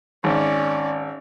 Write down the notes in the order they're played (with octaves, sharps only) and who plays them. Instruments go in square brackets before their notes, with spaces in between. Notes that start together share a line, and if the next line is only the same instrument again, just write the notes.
[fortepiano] G#1 [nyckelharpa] C#4 D5